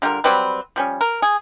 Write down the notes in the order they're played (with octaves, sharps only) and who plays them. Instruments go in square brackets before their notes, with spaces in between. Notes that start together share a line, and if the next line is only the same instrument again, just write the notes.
[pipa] D3 G3 F4 A#4
F#3 G3 C4 B4
F3 G3 C#4
A#4
G#4